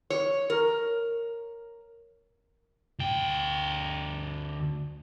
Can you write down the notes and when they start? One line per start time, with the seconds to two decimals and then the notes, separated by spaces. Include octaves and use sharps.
0.10 C#5
0.50 A#4
2.99 D2 G5